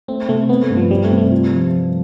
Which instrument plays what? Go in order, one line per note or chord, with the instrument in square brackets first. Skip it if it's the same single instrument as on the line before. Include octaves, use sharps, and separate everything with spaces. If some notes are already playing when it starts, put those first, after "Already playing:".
[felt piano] A3 [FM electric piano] C4
[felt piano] C3 [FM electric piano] A3
[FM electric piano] B3 [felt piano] C4
[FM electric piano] A3
[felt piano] G2
[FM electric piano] F3
[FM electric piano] G3 [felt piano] C4
[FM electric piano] A3
[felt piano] C3
[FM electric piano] A3
[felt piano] F4
F3